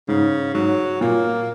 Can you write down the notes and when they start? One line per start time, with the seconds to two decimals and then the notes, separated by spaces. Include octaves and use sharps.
0.08 G#2 C#3
0.54 G#2 F#3
1.01 A#2 A#3